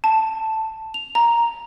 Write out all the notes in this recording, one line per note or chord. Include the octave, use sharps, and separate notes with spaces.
A5
F7
A#5